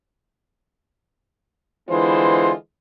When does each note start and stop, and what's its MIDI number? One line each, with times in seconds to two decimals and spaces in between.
1.89 2.52 50
1.89 2.52 52
1.89 2.52 56
1.89 2.52 59
1.89 2.52 65
1.89 2.52 72